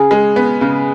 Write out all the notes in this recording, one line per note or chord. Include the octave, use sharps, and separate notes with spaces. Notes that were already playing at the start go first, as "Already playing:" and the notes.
Already playing: C#3 G#4
G#3
B3
C#3